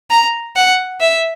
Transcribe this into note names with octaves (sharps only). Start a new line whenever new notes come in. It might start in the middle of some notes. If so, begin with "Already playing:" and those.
A#5
F#5
E5